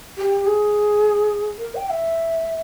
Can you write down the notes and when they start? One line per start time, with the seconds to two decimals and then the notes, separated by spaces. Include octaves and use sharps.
0.18 G4
0.46 G#4
1.59 A#4
1.75 G5
1.87 G5
1.90 E5